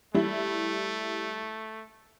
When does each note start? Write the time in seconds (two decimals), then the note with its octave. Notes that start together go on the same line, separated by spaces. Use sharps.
0.14 G3 A3 E4